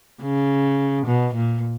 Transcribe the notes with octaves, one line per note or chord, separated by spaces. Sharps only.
C#3
B2
A#2